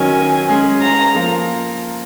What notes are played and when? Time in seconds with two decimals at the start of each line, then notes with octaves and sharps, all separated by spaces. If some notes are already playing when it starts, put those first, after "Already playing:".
Already playing: D#3 F#3 C#4 G#5
0.48 G#3 C#4 G#4
0.82 A#5
1.15 F3 A#3 F4